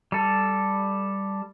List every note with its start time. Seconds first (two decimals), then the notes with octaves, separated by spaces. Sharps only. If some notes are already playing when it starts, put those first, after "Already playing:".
0.12 G3 A4